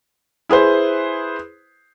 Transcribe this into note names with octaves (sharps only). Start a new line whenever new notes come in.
E4 G#4 B4 C5